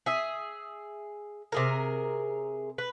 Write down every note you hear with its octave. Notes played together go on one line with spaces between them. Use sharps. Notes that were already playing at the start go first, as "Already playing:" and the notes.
G#4 E5
C3 G#4 A#4
B4